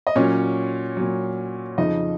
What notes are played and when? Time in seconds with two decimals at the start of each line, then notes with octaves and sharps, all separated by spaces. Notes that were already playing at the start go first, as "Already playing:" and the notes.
0.07 D#5
0.16 A#2 F#3 C#4 C#5
0.97 A#2 F#3
1.78 F2 C#3 F3 D#4 D#5